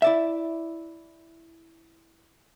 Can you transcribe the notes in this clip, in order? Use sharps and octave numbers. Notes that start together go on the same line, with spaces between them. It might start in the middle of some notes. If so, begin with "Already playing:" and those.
E4 D5 E5